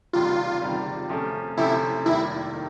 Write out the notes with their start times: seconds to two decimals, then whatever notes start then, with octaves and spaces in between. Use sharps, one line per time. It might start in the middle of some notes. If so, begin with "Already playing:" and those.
0.13 F#1 E2 C3 D#3 G3 F4
0.62 F#1 E2 C3 D#3 G3
1.09 C3 F3 A3 C#4
1.57 C3 F3 A3 C#4 E4
2.05 F1 D#2 D#3 G3 E4
2.54 D#3